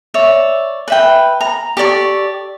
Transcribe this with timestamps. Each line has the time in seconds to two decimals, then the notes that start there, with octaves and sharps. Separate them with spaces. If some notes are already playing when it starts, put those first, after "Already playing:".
0.14 C#5 D5 E5
0.88 B4 E5 G5
1.41 A#5
1.77 G4 A4 D5 C#6